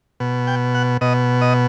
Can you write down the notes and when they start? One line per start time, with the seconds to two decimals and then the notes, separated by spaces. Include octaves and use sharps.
0.20 B2
0.47 G5
0.75 F#5
1.01 B2 D#5
1.41 D#5